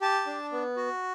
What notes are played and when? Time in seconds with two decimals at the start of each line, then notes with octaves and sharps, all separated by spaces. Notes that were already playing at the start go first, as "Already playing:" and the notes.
0.01 G4 A5
0.26 D4
0.52 B3
0.76 F#4